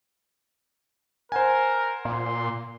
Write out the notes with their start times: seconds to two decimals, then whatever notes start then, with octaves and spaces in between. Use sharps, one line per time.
1.32 A#4 C5 F#5 G#5
2.05 A#2 C6